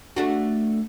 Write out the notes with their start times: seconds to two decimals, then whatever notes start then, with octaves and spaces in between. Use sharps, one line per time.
0.16 A3 D4 F#4